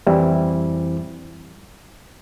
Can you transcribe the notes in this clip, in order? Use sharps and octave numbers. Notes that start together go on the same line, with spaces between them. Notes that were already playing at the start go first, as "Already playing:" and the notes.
F2 E3 G3 C4 E4